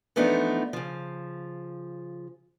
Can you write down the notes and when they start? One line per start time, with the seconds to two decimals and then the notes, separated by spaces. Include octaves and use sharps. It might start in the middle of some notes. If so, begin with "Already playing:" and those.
0.16 E3 F3 A3 B3 D4 D#4
0.73 C#3 F3